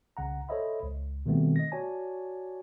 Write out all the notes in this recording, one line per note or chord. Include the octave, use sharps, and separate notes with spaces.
C2 C#3 F#5 A#5
A4 C5 C#5 D#5 E5 B5
C#2
B2 D#3 G3 A3 B3 C4
D#5 A#6
F#4 C#5 D5 G#5 A5